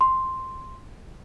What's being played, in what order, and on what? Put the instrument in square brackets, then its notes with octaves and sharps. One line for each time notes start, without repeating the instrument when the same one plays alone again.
[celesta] C6